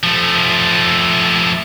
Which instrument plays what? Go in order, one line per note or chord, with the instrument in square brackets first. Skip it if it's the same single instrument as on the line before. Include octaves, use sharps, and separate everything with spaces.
[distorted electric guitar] F3 A3